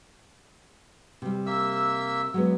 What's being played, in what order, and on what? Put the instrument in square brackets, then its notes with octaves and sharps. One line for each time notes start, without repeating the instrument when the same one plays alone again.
[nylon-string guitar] C3 G3
[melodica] A#3 E5 E6
[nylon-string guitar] F#3 G#3 B3